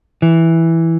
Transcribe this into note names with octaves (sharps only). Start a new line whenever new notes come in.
E3